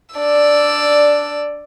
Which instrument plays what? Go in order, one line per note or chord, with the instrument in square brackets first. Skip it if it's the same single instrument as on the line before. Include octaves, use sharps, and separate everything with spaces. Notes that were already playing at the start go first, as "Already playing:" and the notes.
[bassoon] D4 [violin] D5 E6